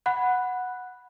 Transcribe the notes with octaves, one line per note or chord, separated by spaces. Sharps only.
F#5 B5 F#6